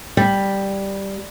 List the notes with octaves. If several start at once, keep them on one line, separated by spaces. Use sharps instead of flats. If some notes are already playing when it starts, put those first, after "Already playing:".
G3